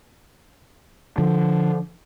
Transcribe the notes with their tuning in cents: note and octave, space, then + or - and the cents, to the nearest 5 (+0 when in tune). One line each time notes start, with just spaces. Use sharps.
D3 +0 F3 +0